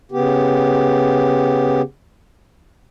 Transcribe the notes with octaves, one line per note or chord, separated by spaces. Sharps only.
C#3 B3 G4